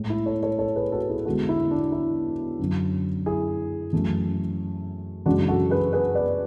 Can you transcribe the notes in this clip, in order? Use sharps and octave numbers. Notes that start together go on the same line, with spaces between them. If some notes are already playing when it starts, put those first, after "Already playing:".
Already playing: A2 G#3
E4
A4 C#5
A4 C#5
A4 C#5
G#4 B4
F#4 A4
E4 G#4
E2 D3 G#3 F#4 A4
E4
D4
E4
F#2 D3 F#3
E4 G#4
F#2 E3 A3
F#2 C#3 E3 G#3 D4 F#4
F#4 A4
G#4 B4
G#4 B4
B4 D5